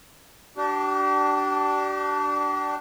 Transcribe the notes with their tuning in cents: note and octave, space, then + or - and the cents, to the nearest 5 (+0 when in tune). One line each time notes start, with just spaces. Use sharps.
D4 +0 G4 -40